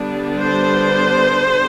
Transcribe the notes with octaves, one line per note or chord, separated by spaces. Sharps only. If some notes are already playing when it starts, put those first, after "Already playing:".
Already playing: D3 G3 B3 D4
C5